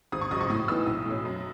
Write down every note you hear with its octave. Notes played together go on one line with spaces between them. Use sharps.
G#1 D#6
C#6
F#2 C#3 G#3 D#6
C#6
A2 D#6
E3 B3 D#4 E6
B1 D#6
A2 F#3 C#4
F#2